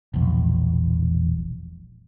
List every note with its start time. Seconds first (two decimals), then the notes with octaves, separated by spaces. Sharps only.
0.14 E1 A#1